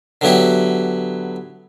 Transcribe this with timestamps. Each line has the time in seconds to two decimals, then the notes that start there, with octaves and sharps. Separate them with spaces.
0.21 D3 F#3 B3 E4 G4